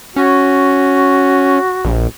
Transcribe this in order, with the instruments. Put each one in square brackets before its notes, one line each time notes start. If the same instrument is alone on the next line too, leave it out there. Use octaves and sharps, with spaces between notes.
[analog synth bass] C#4 [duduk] F#4
[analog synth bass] A#1